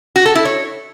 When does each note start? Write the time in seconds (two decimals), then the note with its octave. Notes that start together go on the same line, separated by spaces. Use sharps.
0.16 F#4
0.26 A4
0.35 E4
0.45 C#5